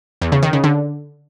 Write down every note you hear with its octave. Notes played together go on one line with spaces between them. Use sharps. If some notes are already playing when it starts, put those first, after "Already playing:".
E2
C#3
D#3
C#3
D3